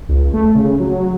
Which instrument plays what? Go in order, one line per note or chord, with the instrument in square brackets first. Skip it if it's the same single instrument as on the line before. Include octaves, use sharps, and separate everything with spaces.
[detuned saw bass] C#2
A3
C#3
F#3